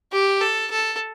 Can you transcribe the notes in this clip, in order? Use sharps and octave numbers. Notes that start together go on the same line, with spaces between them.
G4
A4
A4